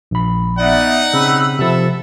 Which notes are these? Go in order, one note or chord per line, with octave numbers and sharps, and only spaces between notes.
A#1 B5
B3 D#4 D5 E5 F#5
C#3 C4 B5 E6
C3 F3 A4 E5